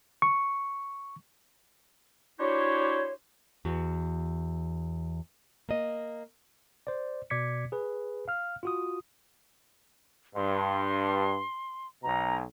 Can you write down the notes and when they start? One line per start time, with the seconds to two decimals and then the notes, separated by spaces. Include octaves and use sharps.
0.22 C#6
2.39 D4 E4 F#4 G4 C5 C#5
3.65 E2 F#4
5.69 A#3 D#5
6.87 C5 D5
7.30 B2 D5 D6 G#6 B6 C#7
7.72 G#4 B4
8.28 F5 F6
8.63 F4 F#4 D#6
10.36 G2 C6
12.03 B1 B2 A#5